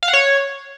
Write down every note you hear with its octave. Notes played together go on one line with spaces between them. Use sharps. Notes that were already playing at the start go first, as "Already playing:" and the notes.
F5
F#5
C#5